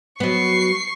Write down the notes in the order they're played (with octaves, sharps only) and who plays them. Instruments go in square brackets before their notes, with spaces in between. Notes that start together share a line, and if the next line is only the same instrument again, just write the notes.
[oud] F#3 B3 [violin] C#6 C7